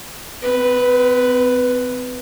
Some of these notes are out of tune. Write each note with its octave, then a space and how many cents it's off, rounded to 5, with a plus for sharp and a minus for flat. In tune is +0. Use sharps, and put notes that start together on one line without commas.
C4 -40 B4 +0